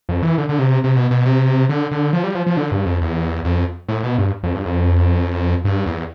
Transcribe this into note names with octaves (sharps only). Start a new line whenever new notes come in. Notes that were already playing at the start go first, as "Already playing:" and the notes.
F2
E3
D3
D3
C3
C3
B2
B2
C3
D3
D3
F3
G3
F3
F3
D3
G2
F2
E2
F2
A2
B2
G2
F2
G2
F2
G2
E2